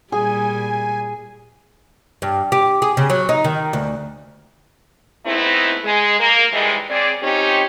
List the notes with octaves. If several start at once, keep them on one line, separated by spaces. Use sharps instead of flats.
A#2 G3 G#4 G#5
G2
G4
G#4
C#3
F#3
D#4
D#3
D2
G#3 A3 B3 C4 D#4 E4
G#3
A#3
G#2 E3 G3 G#3
C#3 C4 G#4 D5
F3 C4 C#4 D#4 G4